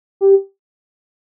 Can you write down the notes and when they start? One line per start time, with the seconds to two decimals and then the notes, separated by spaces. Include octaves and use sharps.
0.21 G4